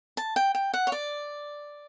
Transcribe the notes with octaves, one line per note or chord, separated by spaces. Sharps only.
A5
G5
G5
F#5
C#5
D5